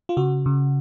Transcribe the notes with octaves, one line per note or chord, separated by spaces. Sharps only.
F4
C#3 F#4
C#3